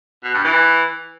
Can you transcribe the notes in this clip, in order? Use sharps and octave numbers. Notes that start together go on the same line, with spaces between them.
B2
G2
E3